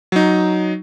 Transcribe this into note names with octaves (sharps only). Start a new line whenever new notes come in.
F#3 D#4